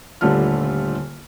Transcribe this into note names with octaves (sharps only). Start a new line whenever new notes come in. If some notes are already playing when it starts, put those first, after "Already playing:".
D#1 D3 G3 A3 F4 F6